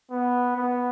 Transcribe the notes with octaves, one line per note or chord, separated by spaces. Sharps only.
B3
B3